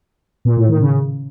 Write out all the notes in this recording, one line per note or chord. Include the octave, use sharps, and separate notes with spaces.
A#2
A2
D#3
C#3